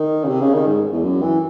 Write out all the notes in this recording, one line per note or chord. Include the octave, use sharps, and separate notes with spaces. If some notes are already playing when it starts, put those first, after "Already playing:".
Already playing: D#3
C#3
C3
C#3
D#3
G#2
E2
F#2
E3